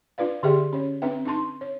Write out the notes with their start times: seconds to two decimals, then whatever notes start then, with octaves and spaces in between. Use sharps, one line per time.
0.18 D4 F4 B4 D5 F5
0.43 D3 G4 G#4 D5 E5 G5
0.73 C#4 C#5
1.02 C4 D4 B4 E5 G5
1.26 D4 D#4 A5 C6
1.61 C#5